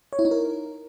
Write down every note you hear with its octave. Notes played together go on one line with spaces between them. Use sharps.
C#5
E4
D#4
A#4